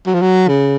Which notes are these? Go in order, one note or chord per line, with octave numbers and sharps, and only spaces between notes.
F#3
F3
F#3
C#3